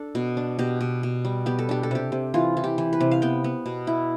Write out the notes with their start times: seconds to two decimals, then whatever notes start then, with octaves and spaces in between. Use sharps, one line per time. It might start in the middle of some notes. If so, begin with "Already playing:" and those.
Already playing: D4 A4
0.15 B2
0.37 D4
0.59 B2 G4
0.81 B2
1.03 B2
1.25 G3
1.46 B3 G4
1.59 A4
1.69 D4 G4
1.83 A4
1.91 C3 G4
2.12 C3
2.34 E3 F4
2.57 E3
2.64 G4
2.78 E3
2.93 B4
3.01 C3
3.11 F5
3.22 B3 G5
3.44 B3
3.66 B2
3.87 E4